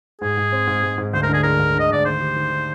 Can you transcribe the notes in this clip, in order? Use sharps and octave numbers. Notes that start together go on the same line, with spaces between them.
G#2 G#4
G#2
C4
G#2
G#2
G#2
D2 C5
A#4
D3 G#4
G#3 A#4
D2
D3 D#5
D2 D5
D#3 C5
G4
D#3
D#3